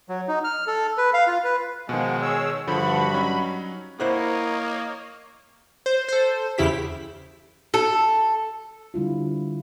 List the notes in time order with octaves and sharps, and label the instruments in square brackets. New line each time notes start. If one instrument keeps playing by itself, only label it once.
[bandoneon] F#3
D#4
F6
A4
B4
F5
F4
B4
[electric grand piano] B2 D#3 [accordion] F3 F#5 [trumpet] G#3
[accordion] G#4 C#5 E6
[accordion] G2 B5 [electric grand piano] D3 F3 [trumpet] F#4
[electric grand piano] F#3 C#4 D#4
[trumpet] A#3 [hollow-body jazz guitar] E4 C5 F#5 [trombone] A#4 [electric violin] C#5 D#5
[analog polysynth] C5
A4 C5
E2 C#3 E4 G4 B6
[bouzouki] A4
[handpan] D3 G3 E4 F4